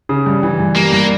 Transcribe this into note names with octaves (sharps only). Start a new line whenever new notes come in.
C#3
G2
E3
G2
G3 A#3
G2